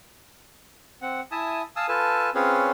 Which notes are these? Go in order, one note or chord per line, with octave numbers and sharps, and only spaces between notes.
C4 F#5
E4 E5 G#5 A5 D#6
F5 G#5 A5 D#6 E6
F4 A4 B4 G#5 A5
C4 C#4 F4 G#4 B4 C#5